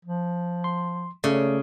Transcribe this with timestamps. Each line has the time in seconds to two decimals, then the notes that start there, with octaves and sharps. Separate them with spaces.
0.05 F3
0.64 C6
1.24 C#3 A3 A4 D5